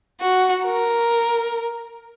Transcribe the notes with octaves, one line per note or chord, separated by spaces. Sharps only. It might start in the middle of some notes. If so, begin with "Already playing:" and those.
F#4
A#4